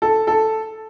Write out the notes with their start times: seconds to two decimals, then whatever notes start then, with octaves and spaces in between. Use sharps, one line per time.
0.02 A4
0.27 A4